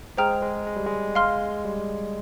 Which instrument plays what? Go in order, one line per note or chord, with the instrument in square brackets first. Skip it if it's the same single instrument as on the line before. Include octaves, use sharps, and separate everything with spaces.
[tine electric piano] G#3 [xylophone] G#4 C5 G5 A#5 F6
[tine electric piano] G#3
G#3
G3
G#3
[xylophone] F5 C6 F6
[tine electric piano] G3